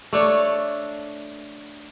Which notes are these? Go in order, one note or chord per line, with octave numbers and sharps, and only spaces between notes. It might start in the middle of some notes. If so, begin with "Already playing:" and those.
A3 D4 C#5